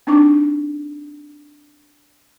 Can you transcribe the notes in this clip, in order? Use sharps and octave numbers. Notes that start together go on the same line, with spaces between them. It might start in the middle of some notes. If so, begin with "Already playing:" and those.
C4 D4 D#4 C#6 D6